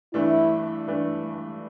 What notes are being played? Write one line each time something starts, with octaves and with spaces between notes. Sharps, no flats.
G2 E3 A3 D4 E4
G2 E3 A3 D4